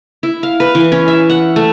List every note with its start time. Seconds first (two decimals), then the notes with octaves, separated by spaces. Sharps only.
0.23 E4
0.43 F5
0.60 B4
0.75 E3
0.92 C#4
1.08 E5
1.30 F#5
1.56 A3